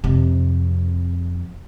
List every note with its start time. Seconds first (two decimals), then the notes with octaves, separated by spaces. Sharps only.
0.04 F2 C3